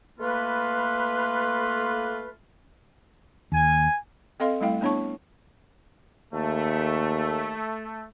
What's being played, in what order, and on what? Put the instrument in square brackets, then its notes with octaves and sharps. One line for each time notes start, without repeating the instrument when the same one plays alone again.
[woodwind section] A3 A#3 F4 B4
[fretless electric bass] D#2 [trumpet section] G#5
[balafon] C4 A4 D#5 F5 C6
G3 A3 E4 F5 G5
B3 D4 E4 C#5 A5 C#6
[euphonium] D#2 [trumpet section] A3